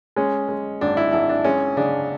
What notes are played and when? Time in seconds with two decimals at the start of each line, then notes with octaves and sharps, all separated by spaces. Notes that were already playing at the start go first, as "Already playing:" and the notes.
0.16 G#3 C#4
0.49 G#3
0.81 G#1 D4
0.97 E4
1.12 G#1 E4
1.29 D4
1.44 G#3 C#4
1.77 C#3 D4